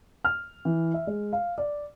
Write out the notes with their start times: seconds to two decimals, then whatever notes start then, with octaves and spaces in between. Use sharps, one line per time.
0.25 F6
0.65 E3
0.94 E5
1.07 G#3
1.33 F5
1.58 D5